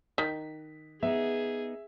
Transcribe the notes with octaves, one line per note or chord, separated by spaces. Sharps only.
D#3 B6
B3 D#4 G#4 E5